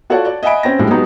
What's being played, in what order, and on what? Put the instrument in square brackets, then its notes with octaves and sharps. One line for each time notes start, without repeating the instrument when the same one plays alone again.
[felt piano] F4 F#4 A4 C#5 D5 F#5
D5
D#5 E5 F#5 G#5 B5 D7
C4 C#4 G5 A#6
A#1 A2 G3 G#3
F#3 G#3 B3 D#4 F#4 G4